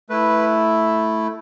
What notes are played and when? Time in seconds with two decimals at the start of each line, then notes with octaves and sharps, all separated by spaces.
0.09 A3 E4 B4